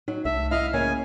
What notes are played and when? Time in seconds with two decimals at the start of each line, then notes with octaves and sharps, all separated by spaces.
0.08 F#3 D#4
0.25 C2 A3 E5
0.51 E4 D#5 F5 F6
0.73 C#3 A#3 C#4 G#5